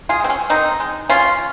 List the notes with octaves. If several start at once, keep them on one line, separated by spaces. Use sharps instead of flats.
F4 G#4
G#3 C4
C#4
D#3 C4 D#4
G#3
C#3 C#4 F4